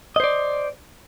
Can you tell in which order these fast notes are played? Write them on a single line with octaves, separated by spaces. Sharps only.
D#5 C5 D5